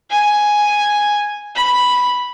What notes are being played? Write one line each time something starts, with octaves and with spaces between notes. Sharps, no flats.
G#5
B5